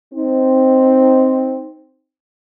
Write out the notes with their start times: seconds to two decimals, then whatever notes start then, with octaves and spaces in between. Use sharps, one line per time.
0.12 C4 D#4